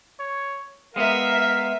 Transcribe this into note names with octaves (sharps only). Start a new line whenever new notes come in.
C#5
G#3 B3 A#4 E5 F5